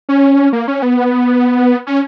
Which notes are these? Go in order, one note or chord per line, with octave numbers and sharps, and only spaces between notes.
C#4
A#3
C#4
B3
C#4